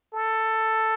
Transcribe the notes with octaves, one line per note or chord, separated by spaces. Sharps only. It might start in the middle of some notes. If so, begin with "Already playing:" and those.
A4